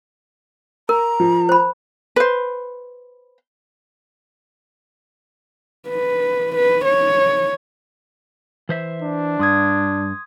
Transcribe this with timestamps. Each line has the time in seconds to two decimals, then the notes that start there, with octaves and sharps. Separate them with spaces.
0.89 A#4 A#5
1.20 F3
1.49 C5 B5
2.16 B4 C5
5.88 B4
6.56 B4
6.85 C#5
8.69 E3 C5 E5
9.02 D4
9.39 G2 C6 D#6 G#6